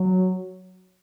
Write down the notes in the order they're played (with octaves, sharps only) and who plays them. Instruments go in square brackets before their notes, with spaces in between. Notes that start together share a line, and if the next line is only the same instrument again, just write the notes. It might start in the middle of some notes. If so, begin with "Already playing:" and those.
Already playing: [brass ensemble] F#3